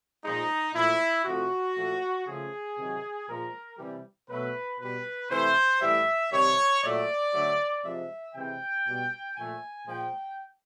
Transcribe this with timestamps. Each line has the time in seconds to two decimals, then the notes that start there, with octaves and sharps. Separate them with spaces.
0.24 A#2 F3 G#3 D#4
0.74 A#2 F3 A3 E4
1.25 C3 F3 A3 F#4
1.76 A#2 F3 A3
2.26 C#3 F3 A3 G#4
2.77 C3 D#3 F#3
3.28 A#2 F3 G#3 A#4
3.78 C3 E3 G3
4.29 B2 F#3 A3 B4
4.79 B2 G3 B4
5.30 C3 E3 A3 C5
5.81 A2 E3 G3 E5
6.31 C3 D#3 G3 C#5
6.83 A#2 F#3 A3 D5
7.33 D3 F#3 A3
7.83 C3 F3 G#3 E5
8.35 C3 E3 G#3 G5
8.86 B2 G3
9.35 A#2 F3 A3 G#5
9.86 A#2 F3 G#3 G5